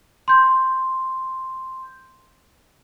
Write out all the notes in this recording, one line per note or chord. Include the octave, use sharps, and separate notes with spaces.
C6 G6